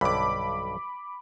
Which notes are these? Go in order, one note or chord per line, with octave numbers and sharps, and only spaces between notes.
B1 G2 D3 B5 D6